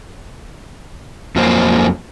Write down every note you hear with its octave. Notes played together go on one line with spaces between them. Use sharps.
F2 F#3 A#3 C5